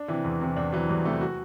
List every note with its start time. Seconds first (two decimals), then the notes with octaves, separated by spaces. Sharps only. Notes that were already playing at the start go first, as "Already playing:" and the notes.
Already playing: D4
0.08 C3 E3 E4
0.24 E2
0.41 C3 E3
0.56 E2 D4
0.72 C3 E3 F#3
0.89 E2 G3
1.04 C3 E3 A3
1.21 F#4